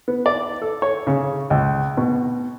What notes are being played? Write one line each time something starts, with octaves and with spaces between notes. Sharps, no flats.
B3
D5
A4
C#5
C#3
C#2
B2